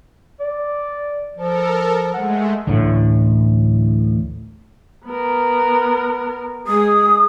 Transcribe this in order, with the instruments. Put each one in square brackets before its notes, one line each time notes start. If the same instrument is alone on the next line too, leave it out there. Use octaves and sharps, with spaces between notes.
[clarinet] D5
[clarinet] F3 [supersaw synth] A4 A#4
[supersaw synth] G#3 A3 [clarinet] F#5
[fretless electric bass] D1 A1 A2 D3
[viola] B3 A#4
[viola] G#3 G#4 [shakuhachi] D#6